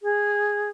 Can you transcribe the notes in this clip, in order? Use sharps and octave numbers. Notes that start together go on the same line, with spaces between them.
G#4